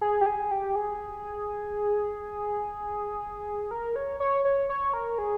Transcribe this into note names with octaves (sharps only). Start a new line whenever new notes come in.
G#4
G4
G#4
G4
G#4
A#4
C#5
C#5
C#5
C#5
A#4
G#4